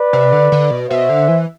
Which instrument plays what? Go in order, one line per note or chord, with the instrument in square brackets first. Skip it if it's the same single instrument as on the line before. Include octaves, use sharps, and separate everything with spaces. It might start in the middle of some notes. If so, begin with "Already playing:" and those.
Already playing: [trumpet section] B4 D5
[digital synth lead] C3
D3
D3
B2
[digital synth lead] B2 [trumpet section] C5 E5
[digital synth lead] D3
E3